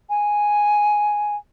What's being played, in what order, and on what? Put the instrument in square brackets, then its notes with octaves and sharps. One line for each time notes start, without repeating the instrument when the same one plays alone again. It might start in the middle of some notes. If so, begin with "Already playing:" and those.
[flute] G#5